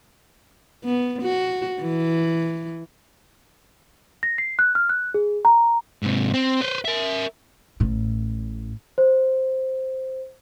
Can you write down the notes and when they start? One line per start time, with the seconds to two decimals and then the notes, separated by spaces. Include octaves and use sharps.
0.84 B3
1.22 F#4
1.82 E3
4.23 A#6
4.38 C7
4.59 F#6
4.75 F6
4.89 F#6
5.14 G#4
5.45 A#5
6.03 G#2 C3
6.34 C4
6.61 B4 C5
6.85 A#4 E5
7.80 A1 A2
8.98 C5